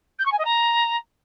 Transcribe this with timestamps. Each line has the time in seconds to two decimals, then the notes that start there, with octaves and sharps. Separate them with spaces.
0.19 G6
0.25 C#6
0.32 G#5
0.38 D#5
0.45 A#5